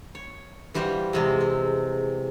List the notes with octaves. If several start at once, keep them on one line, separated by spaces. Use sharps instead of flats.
C#5
E3 G3 F#4 C5 F5
E2 C3 G#3
C4